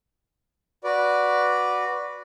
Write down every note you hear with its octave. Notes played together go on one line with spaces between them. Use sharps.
F#4 B4 D5